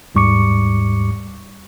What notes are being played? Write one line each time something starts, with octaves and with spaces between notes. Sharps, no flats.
D#2 G#2 G3 C#6 D6 C#7